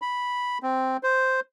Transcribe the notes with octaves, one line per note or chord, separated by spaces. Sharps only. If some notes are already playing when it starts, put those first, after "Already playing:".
B5
C4
C5